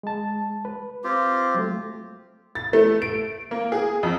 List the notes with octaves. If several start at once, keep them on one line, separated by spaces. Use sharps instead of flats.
G#3 A5
B4
C4 F4 G4
F#3 A3
A6
A3
D7
A#3
G#4
F2